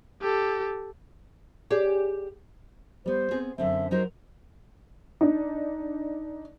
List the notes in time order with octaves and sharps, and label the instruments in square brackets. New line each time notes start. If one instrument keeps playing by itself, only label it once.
[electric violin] G4 A4
[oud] G4 G#4 D5
[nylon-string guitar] G3 B3 [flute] C5
[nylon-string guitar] B3 C4 G#4
[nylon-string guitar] F#2 D3 C4 [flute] E5
[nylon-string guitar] F#3 D#4 A#4 [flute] C5
[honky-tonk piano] D4 D#4